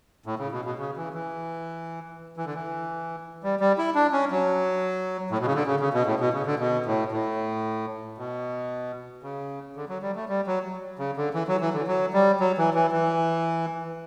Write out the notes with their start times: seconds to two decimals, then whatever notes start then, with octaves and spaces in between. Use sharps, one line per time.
0.26 A2
0.39 C#3
0.52 B2
0.65 B2
0.79 C#3
0.97 E3
1.14 E3
2.37 E3
2.45 D3
2.54 E3
3.43 G3
3.60 G3
3.78 E4
3.95 D4
4.13 C#4
4.31 F#3
5.31 A2
5.38 B2
5.46 C#3
5.54 D3
5.66 C#3
5.80 C#3
5.94 B2
6.06 A2
6.20 B2
6.33 C#3
6.46 D3
6.60 B2
6.86 A2
7.12 A2
8.18 B2
9.23 C#3
9.76 D3
9.89 F#3
10.02 G3
10.16 A3
10.29 G3
10.47 F#3
10.99 C#3
11.17 D3
11.34 E3
11.48 F#3
11.60 E3
11.73 D3
11.87 F#3
12.13 G3
12.40 F#3
12.58 E3
12.74 E3
12.92 E3